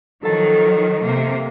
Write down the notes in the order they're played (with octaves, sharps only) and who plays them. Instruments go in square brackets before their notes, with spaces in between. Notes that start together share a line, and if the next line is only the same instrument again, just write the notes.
[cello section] D#3 F3 F#3 [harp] A4 A5
[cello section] C3 A#3